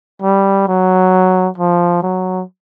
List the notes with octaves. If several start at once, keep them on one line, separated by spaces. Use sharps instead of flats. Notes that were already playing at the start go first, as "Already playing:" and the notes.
G3
F#3
F3
F#3